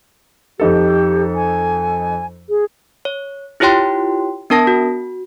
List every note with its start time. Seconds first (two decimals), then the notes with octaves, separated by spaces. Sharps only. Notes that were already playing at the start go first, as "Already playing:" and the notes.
0.60 F2 D#4 G4 A4
1.35 G#5
2.49 G#4
3.05 C#5
3.60 E4 F4 G4 C#5 G5 C6
4.50 B3 D4 A#4 A5 A#6
4.67 F#4